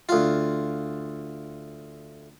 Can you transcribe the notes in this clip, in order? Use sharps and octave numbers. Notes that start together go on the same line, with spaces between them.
D2 F4